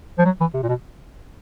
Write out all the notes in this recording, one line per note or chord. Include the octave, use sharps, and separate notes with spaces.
F3
F#3
E3
C3
A#2
B2